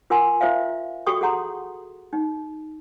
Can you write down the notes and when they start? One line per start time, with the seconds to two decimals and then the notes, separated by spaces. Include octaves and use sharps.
0.10 F4 A#4 F#5 G#5 C6
0.41 F4 C5 E5 F5
1.07 F#4 G4 A4 G5 C#6 D#6
1.21 G#4 A4 F#5 A#5 C6
2.13 D#4